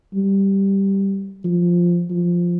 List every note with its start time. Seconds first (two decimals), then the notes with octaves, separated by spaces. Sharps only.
0.15 G3
1.45 F3
2.10 F3